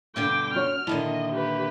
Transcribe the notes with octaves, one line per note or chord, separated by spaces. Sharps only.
G2 B2 D3 F5 G5 D6
C#4 F#4 C#5 F6
A#2 D3 D#3 E4 D#5 A5
G4 B4